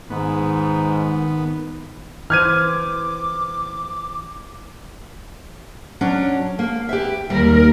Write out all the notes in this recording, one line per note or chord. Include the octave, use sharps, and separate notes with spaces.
G#2 D#3 B3
E3 C5 D6 F6 G#6 D#7
F#3 C#4 D4
A#3
G4 B4 E5
D#2 G3 A#4